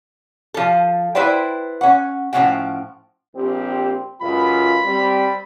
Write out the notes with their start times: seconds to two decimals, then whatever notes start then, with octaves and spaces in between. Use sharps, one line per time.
0.54 F3 A4
1.15 E4 B4 C5 D5 G5
1.81 C#4 F#5
2.33 A2 F3 A3 C#4 F#5 G5
3.36 A#1 C4 G4
4.22 C#2 F#2 F4 B5
4.86 G3 C4